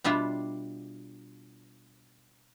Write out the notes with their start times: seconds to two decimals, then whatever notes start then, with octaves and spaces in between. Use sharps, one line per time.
0.04 B2 G3 D4 E4 F4